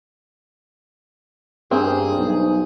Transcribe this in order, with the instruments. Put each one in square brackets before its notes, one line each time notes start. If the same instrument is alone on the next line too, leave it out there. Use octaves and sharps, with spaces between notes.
[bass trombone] G2 [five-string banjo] A#3 C4 [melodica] G#4
[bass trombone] B1